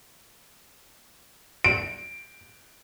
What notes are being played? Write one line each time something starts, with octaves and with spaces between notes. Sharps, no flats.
D7